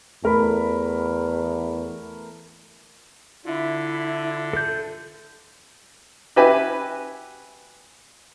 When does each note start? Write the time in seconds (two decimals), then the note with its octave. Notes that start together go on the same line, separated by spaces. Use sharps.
0.23 E2 A3 A#4 B5
3.45 D3 E4 F4 E5
4.53 A4 G6
6.36 F#4 G4 B4 E5 G#5